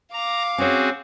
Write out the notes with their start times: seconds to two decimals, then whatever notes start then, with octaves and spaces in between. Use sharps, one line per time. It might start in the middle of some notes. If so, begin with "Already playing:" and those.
0.13 F5 A#5 D6
0.58 C4 C#4 F#4 G#4 C#5